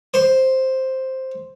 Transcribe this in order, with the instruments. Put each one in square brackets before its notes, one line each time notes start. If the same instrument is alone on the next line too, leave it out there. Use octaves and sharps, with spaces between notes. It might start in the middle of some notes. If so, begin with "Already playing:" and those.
[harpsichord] C5